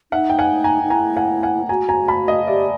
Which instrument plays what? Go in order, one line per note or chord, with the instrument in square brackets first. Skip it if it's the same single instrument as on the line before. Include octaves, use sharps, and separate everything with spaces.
[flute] D#4 [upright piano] E5 F#5
[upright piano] G5
F#5 G#5
G#5 A#5
[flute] D#4
[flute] E4 [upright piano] G#5 A#5
[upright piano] F#5 G#5
F#5 G#5
[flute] F#4 [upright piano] G#5 A#5
[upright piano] G#5 A#5
A5 B5
D#5 F5
[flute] G4 [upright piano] D5 E5